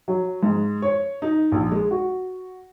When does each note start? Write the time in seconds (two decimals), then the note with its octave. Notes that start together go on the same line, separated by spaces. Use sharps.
0.08 F#3
0.43 G#2
0.82 C#5
1.22 D#4
1.52 A#1
1.71 G#3
1.91 F#4